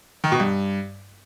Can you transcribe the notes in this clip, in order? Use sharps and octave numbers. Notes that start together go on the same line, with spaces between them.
D#3
B2
G2